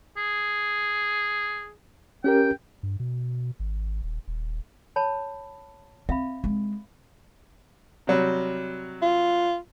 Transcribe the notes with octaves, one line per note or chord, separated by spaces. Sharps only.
G#4
C#4 G4 A#4 G5
G2
B2
G#1
D#1
D#1
C#5 A5 B5
C4 E5 F5 B5
G#3 C4
C3 F#3 G3
F4